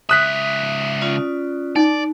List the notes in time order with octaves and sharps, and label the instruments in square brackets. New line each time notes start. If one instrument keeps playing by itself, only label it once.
[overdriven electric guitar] C#2 E5 [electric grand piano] D#6 F#6 B6
[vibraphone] C#4 F4 D5
[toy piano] D#4 [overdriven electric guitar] D5